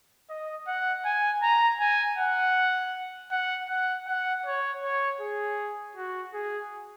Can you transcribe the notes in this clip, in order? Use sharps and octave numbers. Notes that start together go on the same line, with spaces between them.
D#5
F#5
G#5
A#5
G#5
F#5
F#5
F#5
F#5
C#5
C#5
G#4
F#4
G#4